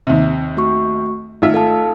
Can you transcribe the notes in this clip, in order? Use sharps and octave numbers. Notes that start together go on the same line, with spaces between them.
D#2 C3
A3 F#4 C#6
G#1 A3 F4 E5
A4 F5 A5